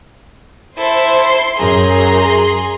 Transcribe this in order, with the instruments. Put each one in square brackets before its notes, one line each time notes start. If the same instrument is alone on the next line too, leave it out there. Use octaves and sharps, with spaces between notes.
[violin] E4 A4 [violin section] C5
[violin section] C6
[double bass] F#2 [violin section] G#4 [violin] A#5 C6